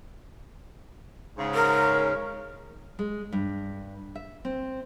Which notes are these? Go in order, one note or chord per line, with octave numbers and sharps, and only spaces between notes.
G#2 C#3
A#4
G#3
G2
E5
C4